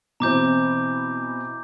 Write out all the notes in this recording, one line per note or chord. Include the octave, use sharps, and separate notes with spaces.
B2 E3 C4 A#5 D6 G6